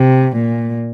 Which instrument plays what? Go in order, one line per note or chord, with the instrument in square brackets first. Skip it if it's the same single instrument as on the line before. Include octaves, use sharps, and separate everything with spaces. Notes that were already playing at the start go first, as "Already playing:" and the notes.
Already playing: [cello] C3
A#2